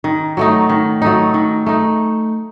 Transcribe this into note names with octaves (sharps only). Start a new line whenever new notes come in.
D#3
F#3 A3 D#4
D#3
F#3 A3 D#4
D#3
A3 D#4